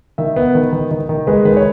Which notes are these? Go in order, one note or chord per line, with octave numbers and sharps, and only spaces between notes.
D#3 E5
B3
D#3
D#3
D#3
D#3
G#3 B4
D#3 B4
C#5